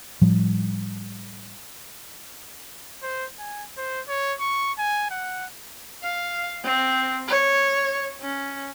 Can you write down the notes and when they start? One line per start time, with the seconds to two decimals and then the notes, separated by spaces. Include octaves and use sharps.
0.21 A2 F3 G3
3.02 C5
3.39 G#5
3.77 C5
4.08 C#5
4.40 C#6
4.78 G#5
5.11 F#5
6.03 F5
6.63 C4
7.28 C#5
8.20 C#4